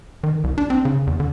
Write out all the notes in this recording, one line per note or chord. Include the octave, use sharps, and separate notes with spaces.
D#3
C2
D4
C4
C#3
E2
D3